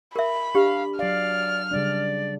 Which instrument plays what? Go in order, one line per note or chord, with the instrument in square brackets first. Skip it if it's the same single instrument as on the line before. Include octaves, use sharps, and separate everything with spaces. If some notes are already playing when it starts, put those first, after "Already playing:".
[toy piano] A#4 E5 [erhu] B5
[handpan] D4 [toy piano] G4 [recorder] F5
[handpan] F#3 F5 [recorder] D5 [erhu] F6
[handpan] C#3 G3 D4 [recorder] D5